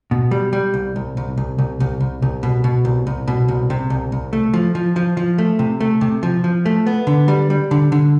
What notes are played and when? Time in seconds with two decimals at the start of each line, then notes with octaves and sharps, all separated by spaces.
0.11 B2
0.31 G3
0.53 G3
0.74 C2
0.96 C2
1.17 C2
1.37 C2
1.58 C2
1.80 C2
2.00 C2
2.22 C2
2.43 B2
2.64 B2
2.85 C2
3.07 C2
3.28 B2
3.48 C2
3.70 C3
3.90 C2
4.12 C2
4.33 A3
4.54 F3
4.75 F3
4.96 F3
5.17 F3
5.38 A3
5.59 C3
5.80 A3
6.01 C3
6.23 F3
6.44 F3
6.66 A3
6.86 B3
7.07 D3
7.28 G3
7.50 G3
7.71 D3
7.92 D3